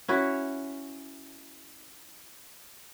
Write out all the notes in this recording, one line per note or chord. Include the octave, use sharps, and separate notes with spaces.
C#4 E4 F#4 C#5